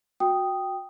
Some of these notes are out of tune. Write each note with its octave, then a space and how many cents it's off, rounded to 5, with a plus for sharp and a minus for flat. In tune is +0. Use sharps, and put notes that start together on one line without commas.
F#4 -15 G5 +0 D#6 +0